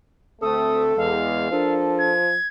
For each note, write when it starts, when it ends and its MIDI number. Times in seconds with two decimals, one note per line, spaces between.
0.42 0.96 38
0.42 0.96 57
0.42 0.96 60
0.42 1.14 69
0.42 0.83 87
0.97 1.51 40
0.97 1.51 56
0.97 1.74 77
1.52 2.35 53
1.52 2.15 62
1.52 2.15 69
1.52 2.15 70
1.99 2.47 92